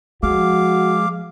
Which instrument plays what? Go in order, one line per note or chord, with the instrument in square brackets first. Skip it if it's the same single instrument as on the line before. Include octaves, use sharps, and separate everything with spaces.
[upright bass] F3 [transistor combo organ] G#3 [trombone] F#4 [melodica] F5 D6